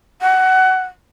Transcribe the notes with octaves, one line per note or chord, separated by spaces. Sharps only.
F#5